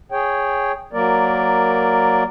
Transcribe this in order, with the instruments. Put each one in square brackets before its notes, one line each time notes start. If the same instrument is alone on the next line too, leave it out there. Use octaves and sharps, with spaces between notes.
[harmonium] G#4 C#5 G5
F#3 A#3 A#4 D5